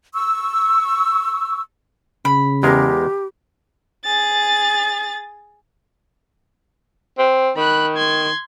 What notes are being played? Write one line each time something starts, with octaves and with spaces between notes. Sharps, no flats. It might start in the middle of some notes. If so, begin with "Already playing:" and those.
C#6 E6
C#3 B5
E2 G#3 G4 A#4
G#4 A6
C4
D#3 B5 F#6
C6 G#6